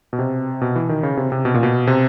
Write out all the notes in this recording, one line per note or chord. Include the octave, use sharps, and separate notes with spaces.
B2
C3
B2
E3
D#3
C#3
C3
C3
B2
A#2
B2
C3